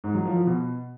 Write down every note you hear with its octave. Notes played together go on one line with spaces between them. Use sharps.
G#2
F#3
F3
F3
B2